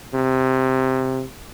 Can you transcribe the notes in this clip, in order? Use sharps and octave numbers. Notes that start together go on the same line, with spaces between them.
C3